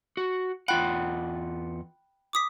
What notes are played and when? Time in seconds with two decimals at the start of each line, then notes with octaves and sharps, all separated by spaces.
0.17 F#4
0.68 E2 F4 F#5 G5 B5 F#6
2.33 D6 D#6 B6